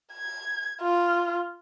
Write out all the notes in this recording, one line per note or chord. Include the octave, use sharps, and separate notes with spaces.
G#6
F4